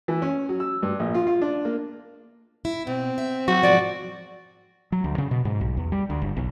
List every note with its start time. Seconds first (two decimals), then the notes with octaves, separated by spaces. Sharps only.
0.08 E3
0.22 C#4
0.49 F#3
0.60 E6
0.82 G2
0.99 A#1
1.14 F4
1.27 F4
1.41 D4
1.65 A#3
2.65 E4
2.87 B2 C4
3.18 E5
3.48 F#3 F#4
3.63 G#2 B2 F3 D5
4.92 F#3
5.04 D2
5.18 C#3
5.31 B2
5.45 G#2
5.61 B1
5.77 E2
5.92 G3
6.10 D2
6.22 G1
6.37 B1